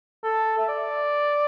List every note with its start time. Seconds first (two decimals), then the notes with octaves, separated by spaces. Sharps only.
0.24 A4
0.58 E5
0.68 D5